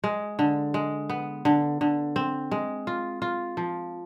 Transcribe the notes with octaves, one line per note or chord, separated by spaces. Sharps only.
G#3
D3
G#3
B3
D3
D3
C4
G#3
F4
F4
F3